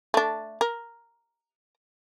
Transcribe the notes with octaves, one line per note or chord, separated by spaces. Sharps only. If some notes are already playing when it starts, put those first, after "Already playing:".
A3 D4
A#4